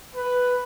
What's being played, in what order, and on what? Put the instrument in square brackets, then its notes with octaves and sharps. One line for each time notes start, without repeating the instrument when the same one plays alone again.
[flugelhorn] B4